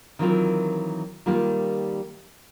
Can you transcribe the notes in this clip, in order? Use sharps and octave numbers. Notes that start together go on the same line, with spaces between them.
D#3 E3 F#3 C4 F4 A#4
D#3 G3 A#3 F4 G4